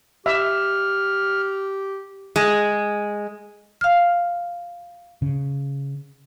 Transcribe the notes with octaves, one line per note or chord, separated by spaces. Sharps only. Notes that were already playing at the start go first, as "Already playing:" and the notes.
G4 E5 F6
G#3
F5 F6
C#3